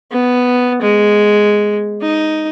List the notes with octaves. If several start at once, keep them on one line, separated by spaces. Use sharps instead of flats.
B3
G#3
D#4